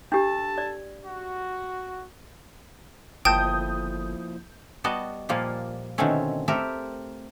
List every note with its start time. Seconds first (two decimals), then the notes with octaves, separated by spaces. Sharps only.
0.12 D4 G4 A4 A5
0.58 D5
1.03 F#4
3.25 G1 F3 A#3 E4 G5 A5 D#6 G6
4.84 G3 B3 F#4 D#5 A5
5.29 A#2 F3 G3 A#3 F4
5.98 B2 D3 D#3 A3 C4 C#4
6.48 A3 C4 G4 A4 A#4